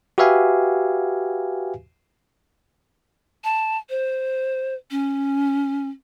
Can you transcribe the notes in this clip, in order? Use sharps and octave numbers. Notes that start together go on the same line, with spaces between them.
F#4 G4 B4 E5 F5 G#5
A5
C5
C#4